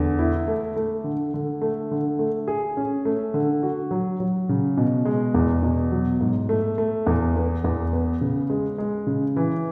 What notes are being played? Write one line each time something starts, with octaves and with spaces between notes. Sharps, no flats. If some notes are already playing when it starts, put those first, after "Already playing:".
Already playing: E2 D3
E4
A3
A3
D3
D3
A3
D3
A3
G#4
C#4
A3
D3
F#4
F#3
F#3
C#3
B2
G#3
E2
B2
F#3
G#2
A3
A3
E2
B3
E2
B3
C#3
G#3
G#3
C#3
E3